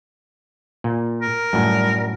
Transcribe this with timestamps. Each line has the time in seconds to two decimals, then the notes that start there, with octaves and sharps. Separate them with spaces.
0.84 A#2
1.22 A#4
1.53 F#2 A2 G3